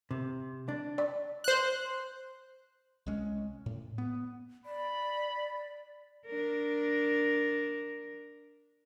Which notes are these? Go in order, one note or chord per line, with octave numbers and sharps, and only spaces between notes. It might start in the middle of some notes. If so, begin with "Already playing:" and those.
C3
D4
D5
C5 F#6
C2 G#3 C#4
A2
B3
D5 B5
D4 A#4